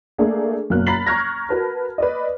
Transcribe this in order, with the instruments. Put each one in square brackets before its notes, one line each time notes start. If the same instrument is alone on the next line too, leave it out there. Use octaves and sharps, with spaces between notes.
[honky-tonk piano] A3 A#3 D4 G#4 A4
F#1 B2 A#3 F6 F#6
A#5 B5 A6 B6 C7 F#7
A#5 C#6 F6 F#6 G#6 A#6
F#4 A#4 B4 A5 B5
B4 D5 D#5